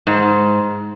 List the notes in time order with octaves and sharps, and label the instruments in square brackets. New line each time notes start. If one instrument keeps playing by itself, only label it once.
[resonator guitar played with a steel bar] G#2